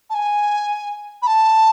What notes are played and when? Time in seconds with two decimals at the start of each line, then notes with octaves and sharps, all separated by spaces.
0.10 A5
0.14 G#5
1.22 B5
1.27 A5